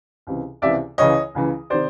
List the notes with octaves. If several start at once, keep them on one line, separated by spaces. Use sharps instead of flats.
C#2 C3 E3
C#2 C3 E3 D5 E5
C#2 C#3 E3 C#5 D#5
C#2 C#3 E3
C3 D#3 C5 D5